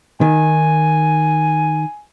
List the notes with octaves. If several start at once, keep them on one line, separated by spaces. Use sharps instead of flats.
D#3 G#5